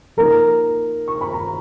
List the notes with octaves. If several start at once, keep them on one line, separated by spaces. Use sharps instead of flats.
F3 A#3 D#4 A#4 A#5
C#6
B5
A#5